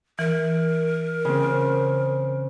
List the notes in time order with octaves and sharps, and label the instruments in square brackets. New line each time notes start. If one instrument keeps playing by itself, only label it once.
[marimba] E3 [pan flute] A#4
[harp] C#3 C4